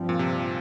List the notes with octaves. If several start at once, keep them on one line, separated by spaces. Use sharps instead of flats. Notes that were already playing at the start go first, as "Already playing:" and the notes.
Already playing: G2 F3 C4
A#2
C3